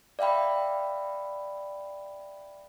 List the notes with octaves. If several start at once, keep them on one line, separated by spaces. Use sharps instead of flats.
D5 E5 F5 G5 B5